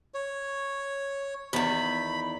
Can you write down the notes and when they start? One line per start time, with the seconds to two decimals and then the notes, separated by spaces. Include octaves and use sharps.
0.14 C#5
1.53 E2 D#3 B5